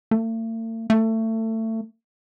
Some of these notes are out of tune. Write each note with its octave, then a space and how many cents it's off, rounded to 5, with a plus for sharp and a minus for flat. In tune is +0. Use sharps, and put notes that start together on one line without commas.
A3 +45
A3 +25